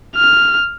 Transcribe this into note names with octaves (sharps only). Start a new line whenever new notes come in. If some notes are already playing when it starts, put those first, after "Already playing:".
F6